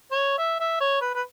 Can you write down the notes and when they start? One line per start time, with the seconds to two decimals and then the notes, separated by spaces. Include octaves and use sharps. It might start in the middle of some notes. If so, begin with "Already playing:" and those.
0.11 C#5
0.38 E5
0.60 E5
0.80 C#5
1.01 B4
1.15 B4